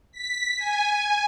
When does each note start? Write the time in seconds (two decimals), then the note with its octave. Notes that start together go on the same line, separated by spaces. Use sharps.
0.12 B6
0.57 G#5